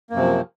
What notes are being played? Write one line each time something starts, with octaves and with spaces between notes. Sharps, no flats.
F#2 C3 F3 A#3